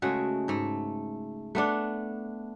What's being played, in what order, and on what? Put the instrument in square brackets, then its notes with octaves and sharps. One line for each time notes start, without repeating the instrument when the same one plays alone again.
[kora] C#3 G#3 A3 F#4
G#2 A3
A3 B3 D4